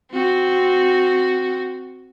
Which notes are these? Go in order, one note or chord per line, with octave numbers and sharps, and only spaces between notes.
C4 F#4